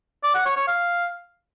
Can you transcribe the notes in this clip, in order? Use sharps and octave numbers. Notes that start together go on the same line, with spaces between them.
D5
F#5
C#5
C#5
F5